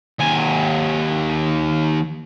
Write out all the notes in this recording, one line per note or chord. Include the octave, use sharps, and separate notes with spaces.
D#2 G#5